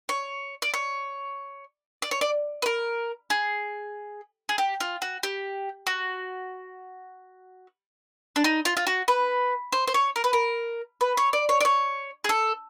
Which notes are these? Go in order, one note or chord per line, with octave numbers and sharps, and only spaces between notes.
C#5
D5
C#5
D5
C#5
D5
B4
A#4
G#4
G#4
G4
F4
F#4
G4
F#4
D4
D#4
F4
F4
F#4
B4
C5
C5
C#5
A#4
B4
A#4
B4
C#5
D5
C#5
D5
C#5
G#4
A4